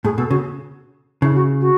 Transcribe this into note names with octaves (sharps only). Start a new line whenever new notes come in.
A2 G#4
B2 A4
C#3 F#4
C#3 E4
F#4
F#4